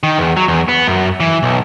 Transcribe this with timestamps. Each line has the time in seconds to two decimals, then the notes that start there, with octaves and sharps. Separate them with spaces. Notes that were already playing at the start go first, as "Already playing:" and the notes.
0.03 D#3
0.18 E2
0.37 F#3
0.48 E2
0.68 B3
0.88 F#2
1.20 E3
1.43 B1